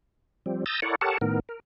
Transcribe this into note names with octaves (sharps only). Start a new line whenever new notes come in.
F3 G3 C4
A#5 D#6 E6 G6 A6
E4 A4 A#4 C#5 D5 F#5
G4 A4 A#4 C#5 F#5 A5
A2 D#3 B3 A#4
A#4